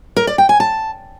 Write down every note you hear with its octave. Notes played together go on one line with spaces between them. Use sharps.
A#4
D5
G5
G#5
A5